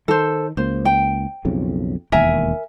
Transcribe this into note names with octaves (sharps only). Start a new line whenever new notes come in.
D#3 A4 C5
C#2 A#3 C5
G5
B1 F2 C#3
E1 D#2 A#4 E5 G#5